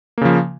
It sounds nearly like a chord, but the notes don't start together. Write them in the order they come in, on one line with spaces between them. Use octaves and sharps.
A#3 C#3 F3